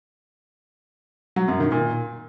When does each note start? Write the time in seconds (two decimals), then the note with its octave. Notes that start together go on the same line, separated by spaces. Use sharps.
1.36 F#3
1.48 F#2
1.60 D#3
1.72 A#2